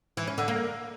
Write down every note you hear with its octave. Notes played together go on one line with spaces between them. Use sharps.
E3
C#4
D3
A#3